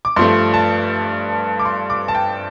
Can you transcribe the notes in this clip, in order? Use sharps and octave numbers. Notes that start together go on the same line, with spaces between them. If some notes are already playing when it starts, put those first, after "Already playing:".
D6
G2 F3 A3 C6
A5
D6
C6
D6
A5
G5